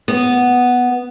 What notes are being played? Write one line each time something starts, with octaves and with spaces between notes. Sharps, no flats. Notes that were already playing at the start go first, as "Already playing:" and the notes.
B3